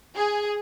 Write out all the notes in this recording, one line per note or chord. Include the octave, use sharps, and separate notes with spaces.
G#4